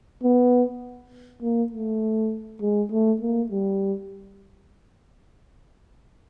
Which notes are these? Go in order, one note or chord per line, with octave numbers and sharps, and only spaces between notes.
B3
A#3
A3
G#3
A3
A#3
G3